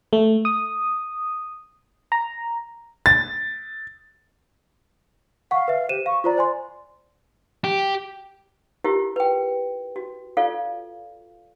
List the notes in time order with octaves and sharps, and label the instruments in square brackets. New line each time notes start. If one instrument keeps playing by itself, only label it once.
[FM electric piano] A3
D#6
A#5
[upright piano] A6
[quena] F5 [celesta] F#5 C#6
[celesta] B4 E5
[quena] G4 [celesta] C5 D#7 E7
[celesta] F5 [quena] C#6
[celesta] F4 C5 A#5 [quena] D5
[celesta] C5 G#5 C6
[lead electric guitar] G4
[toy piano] E4 F4 G4 A#4
B4 G5
F#4
F4 A4 D5 F5